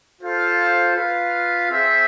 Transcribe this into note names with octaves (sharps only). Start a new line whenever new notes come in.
F4 A4 C5 F5
F4 B4 F5
C4 G#4 C5 E5